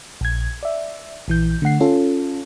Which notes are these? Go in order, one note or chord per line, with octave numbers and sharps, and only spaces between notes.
A#1 G#6
D5 E5
A#1 E3 G6
D3 A3 F#5 C7
C#4 F4 A4